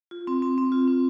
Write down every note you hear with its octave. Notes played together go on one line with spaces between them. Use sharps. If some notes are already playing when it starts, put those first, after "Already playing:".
F4
C4
C4
C4
F4
C4